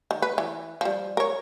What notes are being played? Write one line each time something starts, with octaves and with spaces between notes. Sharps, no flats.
D#3
B4
E3
F3 G3
A#4 C#5